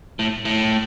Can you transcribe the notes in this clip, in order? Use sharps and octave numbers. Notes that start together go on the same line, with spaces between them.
A2
A2